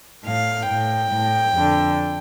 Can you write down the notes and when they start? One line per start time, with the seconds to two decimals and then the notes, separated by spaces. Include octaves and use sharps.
0.24 A2 F5
0.67 A2 G5
1.10 A2
1.53 F2 D3